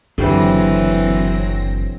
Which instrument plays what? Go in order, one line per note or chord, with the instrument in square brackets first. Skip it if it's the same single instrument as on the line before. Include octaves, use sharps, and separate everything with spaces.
[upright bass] F#1 [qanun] D3 G3 C5 [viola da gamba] E3 [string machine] F#3 C4 A#6